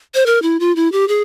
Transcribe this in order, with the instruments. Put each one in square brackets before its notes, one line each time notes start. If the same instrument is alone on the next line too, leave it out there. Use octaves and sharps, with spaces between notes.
[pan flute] C5
A#4
E4
F4
E4
G4
G#4